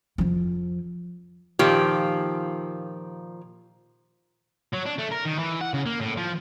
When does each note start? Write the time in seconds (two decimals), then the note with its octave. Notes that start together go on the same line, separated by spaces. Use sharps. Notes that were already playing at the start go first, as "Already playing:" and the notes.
0.18 F2 F3
1.59 A#2 D#3 F3 G4
4.73 F#3
4.85 D4
4.98 A3
5.11 A#4
5.25 D#3
5.39 E3
5.61 F#5
5.74 C#3
5.86 A#3
6.00 A2
6.17 F3